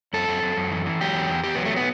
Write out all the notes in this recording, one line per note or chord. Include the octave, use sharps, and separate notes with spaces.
F#2 A4
F#2
F#2
F#2
E3
E3
F#3 G4
E2
E2
E2 G4
F#3 B3
A3
B3